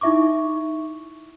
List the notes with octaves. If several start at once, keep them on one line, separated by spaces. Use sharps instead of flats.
D#4 E4 E5 C#6 D6